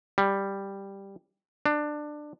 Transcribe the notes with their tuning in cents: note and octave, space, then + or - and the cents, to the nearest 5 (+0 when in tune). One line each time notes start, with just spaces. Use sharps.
G3 +5
D4 +20